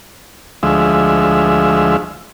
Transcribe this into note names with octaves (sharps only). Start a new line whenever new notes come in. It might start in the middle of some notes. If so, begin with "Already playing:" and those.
D2 F3 G#3 E5